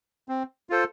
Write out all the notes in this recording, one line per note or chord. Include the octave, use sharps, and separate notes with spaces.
C4
F4 A4 C5